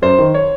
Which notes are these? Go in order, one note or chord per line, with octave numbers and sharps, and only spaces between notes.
F#2 C5
D#3
C#5